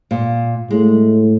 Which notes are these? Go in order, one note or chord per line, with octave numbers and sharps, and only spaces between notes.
A#2
A2 G#3